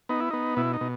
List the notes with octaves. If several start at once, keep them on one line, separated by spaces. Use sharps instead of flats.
B3 D#4
E4
B3 D#4
B2 E4
D#4
B2